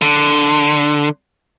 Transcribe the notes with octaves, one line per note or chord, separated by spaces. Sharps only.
D3